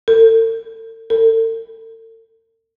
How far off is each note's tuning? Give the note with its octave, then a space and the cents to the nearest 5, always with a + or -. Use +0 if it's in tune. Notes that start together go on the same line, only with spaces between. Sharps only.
A4 +40
A4 +40